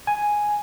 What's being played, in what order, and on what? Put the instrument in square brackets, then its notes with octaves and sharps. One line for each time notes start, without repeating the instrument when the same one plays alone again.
[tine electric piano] G#5